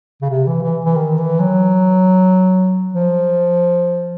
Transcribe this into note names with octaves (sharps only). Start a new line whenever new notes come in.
C#3
C3
E3
E3
E3
D#3
E3
F#3
F3